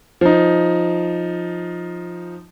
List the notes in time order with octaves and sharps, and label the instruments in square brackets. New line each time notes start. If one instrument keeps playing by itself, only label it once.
[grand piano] F3 D#4